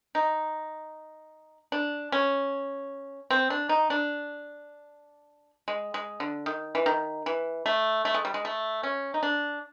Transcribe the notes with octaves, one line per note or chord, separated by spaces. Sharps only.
D#4
D4
C#4
C4
D4
D#4
D4
G#3
G#3
D3
D#3
E3
D#3
E3
A3
A3
G#3
G3
G#3
A3
C#4
D#4
D4